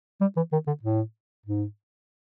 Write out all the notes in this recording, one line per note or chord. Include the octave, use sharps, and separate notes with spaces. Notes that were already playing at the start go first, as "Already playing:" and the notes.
G3
E3
D#3
D3
A2
G#2